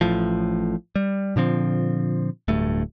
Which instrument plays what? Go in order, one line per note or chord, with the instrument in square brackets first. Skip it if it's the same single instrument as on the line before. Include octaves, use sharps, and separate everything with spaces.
[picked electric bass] A1 A2 F3
G3
A#2 D3 F3 C4
D1 G2 A3